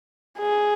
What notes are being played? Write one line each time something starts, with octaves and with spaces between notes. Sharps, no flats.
G#4